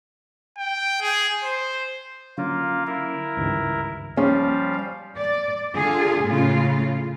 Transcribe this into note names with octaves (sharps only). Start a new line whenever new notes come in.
G5
G#4
C5
D3 F#3 A#3 C#4 F4
E4 A#4
C#2 G2 D#3
F3 G3 C#4 F5
D5
D3 F4 G#4
A2 C#3 F4